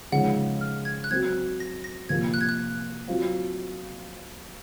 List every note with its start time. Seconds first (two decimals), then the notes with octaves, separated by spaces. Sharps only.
0.12 C#3 F3 G#3 D#4 F#5
0.61 F6
0.85 G#6
1.04 F#6
1.11 F#3 C4 F#4 G#6
1.60 A#6
1.84 A#6
2.09 C3 F3 A#3 G#6
2.34 F#6
2.41 G#6
2.49 F#6
3.08 F#3 C4 F4